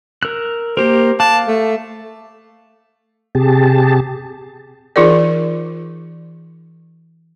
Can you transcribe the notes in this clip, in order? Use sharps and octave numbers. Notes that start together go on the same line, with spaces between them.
A#4 E6 F#6
A#3 G4 A#4 C5
F5 A5 D6 F#6
A3
C3 G4 G#4 A5
E3 D#4 F4 G#4 A#4 D5